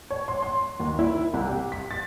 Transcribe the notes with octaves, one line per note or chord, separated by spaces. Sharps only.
C#5
C6
C6
D#2
E4
C2
G4
B6
A6